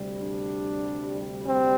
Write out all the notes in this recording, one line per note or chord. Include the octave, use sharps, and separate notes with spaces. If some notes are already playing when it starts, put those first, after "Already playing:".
Already playing: D2 C3 G3
D4
C4